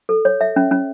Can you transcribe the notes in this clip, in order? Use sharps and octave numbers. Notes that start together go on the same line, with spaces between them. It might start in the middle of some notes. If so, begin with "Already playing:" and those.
A4
C#5
E5
C#4
C#4